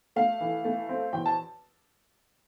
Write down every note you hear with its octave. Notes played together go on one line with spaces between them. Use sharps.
A3 F5
E3
A3
C4
E2 G5
A5